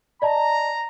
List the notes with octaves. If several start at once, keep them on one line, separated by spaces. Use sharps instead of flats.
D5 D#5 A5 A#5